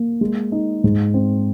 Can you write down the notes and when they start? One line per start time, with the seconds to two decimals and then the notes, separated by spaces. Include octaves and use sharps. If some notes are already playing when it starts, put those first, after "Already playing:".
Already playing: A#3
0.21 G#3
0.52 D#4
0.84 G#2
1.14 C4